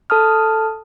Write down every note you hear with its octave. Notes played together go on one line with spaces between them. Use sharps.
A4 A5 D#6 F6